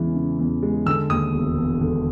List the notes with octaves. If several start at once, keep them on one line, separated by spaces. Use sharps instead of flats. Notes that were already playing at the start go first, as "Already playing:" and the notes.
Already playing: E2 C#3 E3 G#3
C#3
E2
G#3
D3 E6
D#2 D#6
E1
E1
D3